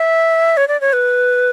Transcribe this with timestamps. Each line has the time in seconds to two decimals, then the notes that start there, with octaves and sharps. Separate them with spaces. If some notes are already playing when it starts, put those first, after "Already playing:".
Already playing: E5
0.57 C#5
0.68 D5
0.81 C#5
0.93 B4